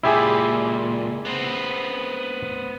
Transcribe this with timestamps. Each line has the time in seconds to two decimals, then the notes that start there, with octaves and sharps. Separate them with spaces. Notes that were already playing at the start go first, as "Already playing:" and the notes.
0.03 C#2 A#2 E4 G4 G#4
1.25 B3 C4